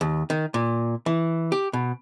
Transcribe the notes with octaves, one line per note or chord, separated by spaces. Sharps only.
D#2
D#3
A#2
E3
G4
B2